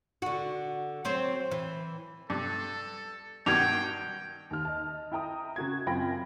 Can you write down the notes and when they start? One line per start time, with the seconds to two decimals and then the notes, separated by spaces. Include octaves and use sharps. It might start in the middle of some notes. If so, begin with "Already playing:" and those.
0.22 D3 F#4
1.05 F#3 C4 C5
1.51 E3
2.30 G2 A4
3.46 G2 B2 D#3 G5 G#6 F7
4.51 D#2 F6
4.65 D#5 A5
5.12 E4 G5 A#5 D#6
5.56 C#3 F#4 G#6
5.86 F#2 C4 F4 G5 B5 A#6